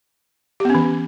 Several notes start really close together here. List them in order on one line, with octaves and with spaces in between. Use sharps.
G4 B3 C#4 E3